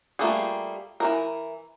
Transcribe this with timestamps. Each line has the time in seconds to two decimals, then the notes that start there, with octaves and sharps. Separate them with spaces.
0.19 G3 A3 A#3 F4 G#4
1.00 E3 A3 A#4